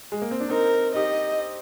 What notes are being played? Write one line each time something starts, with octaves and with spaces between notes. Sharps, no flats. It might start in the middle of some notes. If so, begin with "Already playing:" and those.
G#3
A#3
C4
D4
C4 D#4 A#4
D#4 G4 D#5